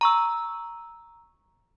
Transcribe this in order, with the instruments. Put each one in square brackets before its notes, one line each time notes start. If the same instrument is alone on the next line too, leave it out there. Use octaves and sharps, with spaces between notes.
[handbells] A#5 C#6 E6